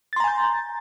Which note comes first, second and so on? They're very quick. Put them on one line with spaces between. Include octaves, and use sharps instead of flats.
A6 C6 A#5 G#5 G6